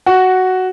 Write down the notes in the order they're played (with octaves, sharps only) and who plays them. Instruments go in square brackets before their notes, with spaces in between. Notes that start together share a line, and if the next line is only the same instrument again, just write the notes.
[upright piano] F#4